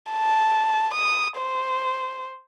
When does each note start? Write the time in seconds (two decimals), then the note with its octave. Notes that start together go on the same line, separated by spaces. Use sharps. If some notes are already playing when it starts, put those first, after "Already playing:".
0.12 A5
0.94 D#6
1.38 C5